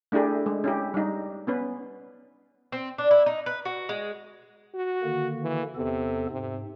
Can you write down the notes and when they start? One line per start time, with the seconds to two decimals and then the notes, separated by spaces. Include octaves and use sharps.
0.12 A3 D4 E4 G4 G#4
0.46 G#3
0.64 C#4 E4 G4
0.94 G3 D#4
1.47 B3 C#4 B4
2.72 C4
2.98 D4
3.11 E4
3.26 D#4
3.46 B4
3.65 F#4
3.89 G#3
4.75 F#4
5.03 D3 D#3 A#3
5.43 E3
5.76 E2 C3 B3 A4
6.30 G#2 C3